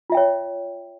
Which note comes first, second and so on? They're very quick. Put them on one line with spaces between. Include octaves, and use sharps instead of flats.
F4 E5 G5 C#5